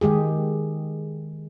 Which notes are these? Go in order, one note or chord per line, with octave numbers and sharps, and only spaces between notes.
D#3 G#3 G4 G#4